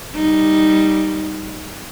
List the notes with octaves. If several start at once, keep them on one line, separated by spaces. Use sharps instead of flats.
G3 D#4